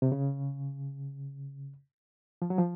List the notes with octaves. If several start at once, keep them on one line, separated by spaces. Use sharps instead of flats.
C3
C#3
F3
F#3
F3